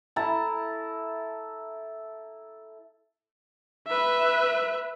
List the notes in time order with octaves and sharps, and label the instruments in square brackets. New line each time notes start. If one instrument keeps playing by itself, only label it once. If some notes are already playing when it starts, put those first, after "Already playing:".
[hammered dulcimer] E4 A4 A5 A#5
[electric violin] B4 E5